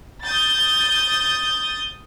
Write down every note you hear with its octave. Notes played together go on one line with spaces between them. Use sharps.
D#6 G6 A6